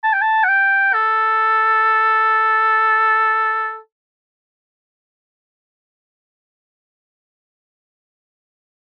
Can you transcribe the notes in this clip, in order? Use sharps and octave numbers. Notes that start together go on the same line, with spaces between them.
A5
G5
A5
F#5
G5
A4